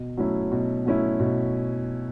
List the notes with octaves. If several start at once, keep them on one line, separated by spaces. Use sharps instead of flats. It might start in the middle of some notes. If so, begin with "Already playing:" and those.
Already playing: B2
F#3 A3 C#4 E4
B2
F#3 A3 C#4 E4
B2